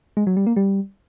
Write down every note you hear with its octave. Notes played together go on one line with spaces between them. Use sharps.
G#3
F#3
G3
A#3
G3